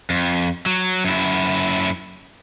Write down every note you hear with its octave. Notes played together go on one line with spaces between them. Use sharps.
F2
F#3
F#2 E4